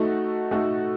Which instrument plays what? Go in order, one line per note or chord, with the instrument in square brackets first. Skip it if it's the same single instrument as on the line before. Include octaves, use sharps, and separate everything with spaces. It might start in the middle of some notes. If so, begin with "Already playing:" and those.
Already playing: [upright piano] A3 D#4 F#4 A4
A3 D#4 F#4 A4